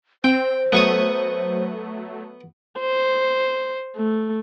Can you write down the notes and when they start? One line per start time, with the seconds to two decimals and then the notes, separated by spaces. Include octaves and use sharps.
0.24 C4 C5 G5
0.72 F#3 A3 B3 C#6 D#6
2.80 C5
3.96 A3